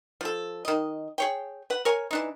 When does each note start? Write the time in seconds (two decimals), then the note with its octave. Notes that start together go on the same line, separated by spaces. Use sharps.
0.21 F3 A4
0.65 D#3 D#5
1.18 G#4 C#5 G5
1.70 B4 F#5
1.85 A#4 C#5 G#5
2.11 E3 D4 D#4